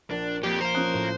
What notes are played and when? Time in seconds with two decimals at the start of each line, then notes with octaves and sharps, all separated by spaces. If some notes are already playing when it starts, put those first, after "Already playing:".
0.11 A#1 D4
0.43 F2 F3 A#3 G4
0.61 C5 F5 A#5
0.75 F3 C#4 D#6 F#6 D#7
0.94 A2